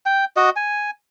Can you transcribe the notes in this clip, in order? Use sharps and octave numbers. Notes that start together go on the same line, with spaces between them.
G5
F#4 D#5
G#5